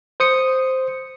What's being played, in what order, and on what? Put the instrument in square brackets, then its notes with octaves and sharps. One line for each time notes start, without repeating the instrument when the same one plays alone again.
[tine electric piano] C5 D#6 C#7